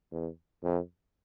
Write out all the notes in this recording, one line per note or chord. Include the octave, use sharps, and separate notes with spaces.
E2
F2